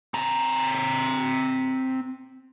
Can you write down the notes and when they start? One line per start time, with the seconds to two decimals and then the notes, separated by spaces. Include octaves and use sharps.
0.14 C4 A#5